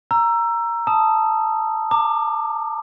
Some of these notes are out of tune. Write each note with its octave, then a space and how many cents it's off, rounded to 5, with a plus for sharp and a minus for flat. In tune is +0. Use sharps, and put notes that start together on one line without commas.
A#5 +0 E6 +20
A5 +0 D#6 +0
A#5 -30 D6 +25